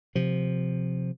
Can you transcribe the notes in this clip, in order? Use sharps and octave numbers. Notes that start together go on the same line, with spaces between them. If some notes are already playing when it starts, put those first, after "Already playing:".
C3 F3